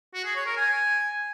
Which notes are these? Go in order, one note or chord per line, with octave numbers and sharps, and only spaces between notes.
F#4
G#4
C#5
A#4
G#5